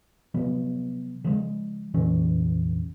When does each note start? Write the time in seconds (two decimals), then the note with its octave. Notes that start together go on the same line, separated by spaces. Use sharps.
0.34 C3 F3 F#3 B3
1.24 C#3 F3 G#3
1.94 F1 A#1 E3 C#4